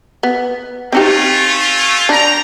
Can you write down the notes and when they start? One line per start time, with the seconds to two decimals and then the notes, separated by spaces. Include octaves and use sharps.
0.23 B3
0.92 A3 C4 C#4 D#4 F4 G4
2.09 D4 G5 A#5